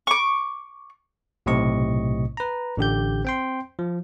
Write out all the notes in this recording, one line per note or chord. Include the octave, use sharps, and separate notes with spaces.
C#6 D6
B1 A2 C3 C4 D#5 C#6
B4 A#5
A1 D3 G4 G6
C4 G5 C6
F3